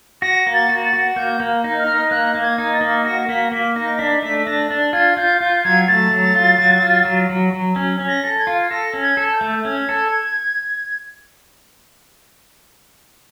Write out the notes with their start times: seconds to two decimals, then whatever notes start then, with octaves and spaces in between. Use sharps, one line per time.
0.22 F#4 A#6
0.47 A#3
0.54 A6
0.69 F#4
0.85 A6
0.93 F#4
1.16 A#3 G6
1.40 A#3
1.64 D#4
1.79 F6
1.87 D#4
2.11 A#3 F#6
2.35 A#3
2.42 G#6
2.58 D#4
2.73 A6
2.81 A#3
3.05 F#4 A#6
3.29 A#3 B6
3.52 A#3 B6
3.76 D#4 A#6
3.95 A#6
3.99 D4 B6
4.23 A3 B6
4.46 D4 A#6
4.70 D4 A6
4.93 F4 G#6
5.17 F4 G6
5.40 F4 G6
5.64 F#3 G#6
5.88 A3 A6
6.11 F#3
6.35 F4
6.59 F#3
6.82 F4
7.05 F#3
7.30 F#3
7.53 F#3
7.76 C#4
8.00 C#4
8.08 A#6
8.24 A4
8.39 G#6
8.47 F4
8.70 A4 A#6
8.94 C#4
9.02 G#6
9.17 A4
9.33 G6
9.41 A3
9.64 C#4 G#6
9.89 A4